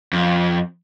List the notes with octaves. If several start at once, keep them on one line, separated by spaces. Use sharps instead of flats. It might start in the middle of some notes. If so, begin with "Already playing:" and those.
F2